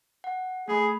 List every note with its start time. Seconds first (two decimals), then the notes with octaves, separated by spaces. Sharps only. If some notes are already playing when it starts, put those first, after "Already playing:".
0.24 F#5
0.68 A3 G#4 B5